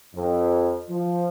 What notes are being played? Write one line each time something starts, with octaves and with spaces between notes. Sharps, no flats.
F2
F3